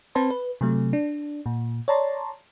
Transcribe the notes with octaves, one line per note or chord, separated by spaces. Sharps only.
C4 B4 C5 A5 C6
B4
C3 F#3 A3
D4
A#2
C#5 D5 A5 A#5 C6